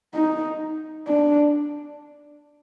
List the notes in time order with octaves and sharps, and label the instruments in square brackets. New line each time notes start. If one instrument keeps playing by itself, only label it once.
[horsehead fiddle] D#4
D4